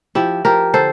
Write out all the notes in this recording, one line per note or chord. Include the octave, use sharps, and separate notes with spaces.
F3 E4 G4
F3 G4 A#4
D3 A4 C5